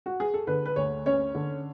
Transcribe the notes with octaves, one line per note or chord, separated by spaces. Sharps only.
F#4
G#4
A4
D3 B4
B4
D2 C#5
C#4 C#5
D3